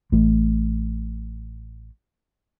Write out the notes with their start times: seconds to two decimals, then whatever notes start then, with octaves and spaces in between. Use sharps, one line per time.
0.12 A1 A2